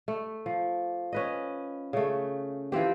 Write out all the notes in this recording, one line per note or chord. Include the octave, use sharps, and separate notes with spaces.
A3
F3
C#4 B4 D#5
C#3 A3
E3 F3 C4 G4